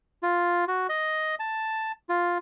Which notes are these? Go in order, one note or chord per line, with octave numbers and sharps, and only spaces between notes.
F4
F#4
D#5
A5
F4